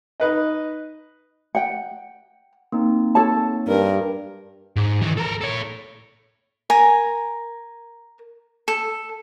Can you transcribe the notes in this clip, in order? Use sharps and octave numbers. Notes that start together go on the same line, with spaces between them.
D#4 B4 D#5
F#5 G5
A#3 C4 D#4
A4 C#5 A5
G2 A#4
G#2
D#3 E3
A4 A#4
A4 C#5
A#4 G#5 A#5
A4